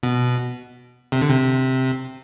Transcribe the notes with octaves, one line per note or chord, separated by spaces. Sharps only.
B2
C3
D3
C3